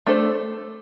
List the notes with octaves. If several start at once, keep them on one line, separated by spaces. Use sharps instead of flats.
A3 D4 A4 C5